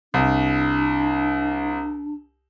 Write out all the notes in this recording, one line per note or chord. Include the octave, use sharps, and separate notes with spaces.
C2 D4